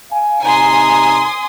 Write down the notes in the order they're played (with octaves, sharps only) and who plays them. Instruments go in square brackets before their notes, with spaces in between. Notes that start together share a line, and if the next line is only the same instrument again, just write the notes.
[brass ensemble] F5 G#5
[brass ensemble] C3 D#4 A#5 [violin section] G#5 C6 D#6